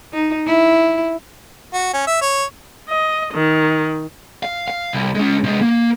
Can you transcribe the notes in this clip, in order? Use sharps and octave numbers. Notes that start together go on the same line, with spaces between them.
D#4
E4
F#4
C#4
E5
C#5
D#5
D#3
F5
F5
C2
G#3 C#4
C3 G#3
A#3